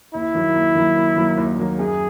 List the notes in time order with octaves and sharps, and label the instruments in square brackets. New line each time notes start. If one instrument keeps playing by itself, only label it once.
[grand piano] D#2 [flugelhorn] E4
[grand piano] D#3 F#3 A#3
D#2
D#3 F#3 A#3
D#2
D#3 F#3 A#3
D#2
D#3 F#3 A#3
[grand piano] F#2 [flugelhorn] G#4